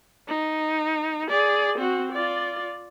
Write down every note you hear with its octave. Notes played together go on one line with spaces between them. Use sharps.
D#4
G#4 D5
C4 F#4
F4 D5